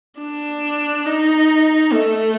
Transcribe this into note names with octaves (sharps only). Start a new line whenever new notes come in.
D4
D#4
A3